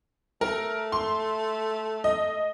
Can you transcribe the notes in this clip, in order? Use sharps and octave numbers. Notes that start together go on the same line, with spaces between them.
A3 A#4
C6
D#5